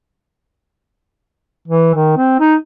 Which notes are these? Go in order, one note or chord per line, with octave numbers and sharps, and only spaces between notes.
E3
D#3
C4
D#4